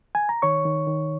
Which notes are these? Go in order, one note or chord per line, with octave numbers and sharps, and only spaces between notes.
G#5
A#5
D#3 C#5 C#6
D#3
D#3